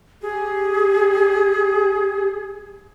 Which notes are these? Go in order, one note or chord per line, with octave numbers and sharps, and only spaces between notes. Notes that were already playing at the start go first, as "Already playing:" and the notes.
G4 G#4